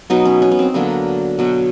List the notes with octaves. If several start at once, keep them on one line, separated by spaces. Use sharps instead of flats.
B2 F#3 B3 D#4
C#4
C#4
B3
C4
D3 F#3 A#3 B3
B2 F#3 B3